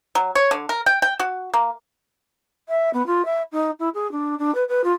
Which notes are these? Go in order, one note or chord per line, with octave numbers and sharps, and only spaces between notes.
F#3
C#5
D3
A#4
G5
G5
F#4
A#3
E5
B3
F4
E5
D#4
E4
G#4
D4
D4
B4
B4
F4